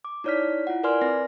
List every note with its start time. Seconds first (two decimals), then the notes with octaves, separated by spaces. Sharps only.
0.05 D6
0.24 D#4 E4 C#5 D5 F6 B6
0.67 E4 F4 F#5
0.83 A#4 B4 D5 G#5 C6 F6
1.02 C4 B4 A#6